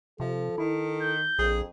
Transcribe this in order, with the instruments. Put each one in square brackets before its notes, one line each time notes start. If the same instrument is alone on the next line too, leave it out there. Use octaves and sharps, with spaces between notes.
[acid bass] C3 [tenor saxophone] F3 [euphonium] A4
[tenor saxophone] D#3 [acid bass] E4
[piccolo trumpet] G6
[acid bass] A#1 [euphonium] F2 [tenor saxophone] G#4